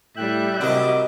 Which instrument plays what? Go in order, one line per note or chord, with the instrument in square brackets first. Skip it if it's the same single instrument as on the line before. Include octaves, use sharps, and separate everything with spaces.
[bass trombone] A2 [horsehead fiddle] G3 E5 [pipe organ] G5 F#6
[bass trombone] C3 [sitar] E4 D#5 [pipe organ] F#4 A#4 D6